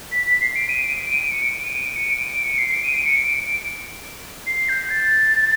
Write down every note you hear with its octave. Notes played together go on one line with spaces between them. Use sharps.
B6
B6
C7
D7
D#7
D7
D7
D#7
D7
C#7
D7
D#7
D7
C#7
D7
D#7
D7
C#7
C7
D7
D#7
D7
C#7
D7
D7
C7
G6
A6